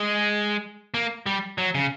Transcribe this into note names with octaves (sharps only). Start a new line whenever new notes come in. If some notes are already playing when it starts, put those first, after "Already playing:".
Already playing: G#3
A#3
G3
F#3
C#3